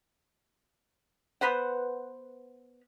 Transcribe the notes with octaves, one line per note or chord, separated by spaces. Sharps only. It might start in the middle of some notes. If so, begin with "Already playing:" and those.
B3 B4 C5 F#5